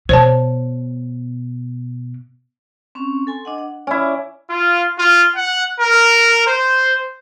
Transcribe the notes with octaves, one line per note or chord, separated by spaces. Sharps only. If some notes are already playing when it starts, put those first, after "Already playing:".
B2 C5 C#5 A5
C4 C#4 C#6
A4 G#5 C6
D4 D#5 F#5
F#5
C#4 E4 D5 D6
F4
F4
F#5
A#4
C5